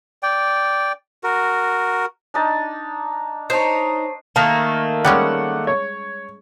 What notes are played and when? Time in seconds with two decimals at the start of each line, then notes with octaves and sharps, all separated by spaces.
0.23 D5 G5
1.24 F#4 A#4
2.34 D4 D#4 A5
3.50 D#4 C5 C#5 A5 A#5 C7
4.36 D#3 A3 A#3 A5
5.05 G3 G#3 C#4 F#5 D6
5.67 C#5